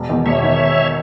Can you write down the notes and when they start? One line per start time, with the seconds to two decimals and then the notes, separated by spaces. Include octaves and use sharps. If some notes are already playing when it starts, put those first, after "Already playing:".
Already playing: E1
0.09 E2 D#3
0.26 E1 C#5 E5
0.43 D#3